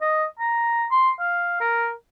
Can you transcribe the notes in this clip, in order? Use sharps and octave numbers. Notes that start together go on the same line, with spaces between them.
D#5
A#5
C6
F5
A#4